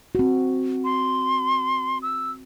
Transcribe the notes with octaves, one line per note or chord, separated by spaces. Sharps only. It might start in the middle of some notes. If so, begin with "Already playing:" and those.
C4 F#4
C6
E6